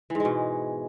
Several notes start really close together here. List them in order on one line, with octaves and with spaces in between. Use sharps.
E3 G#2 G#3 B2